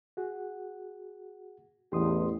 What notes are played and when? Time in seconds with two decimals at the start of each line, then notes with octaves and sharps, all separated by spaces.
0.17 F#4 G#4 F#5
1.92 A1 E2 G4 C6 D#6